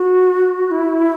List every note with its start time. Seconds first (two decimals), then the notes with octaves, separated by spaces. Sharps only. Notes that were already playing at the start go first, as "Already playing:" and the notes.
Already playing: F#4
0.71 E4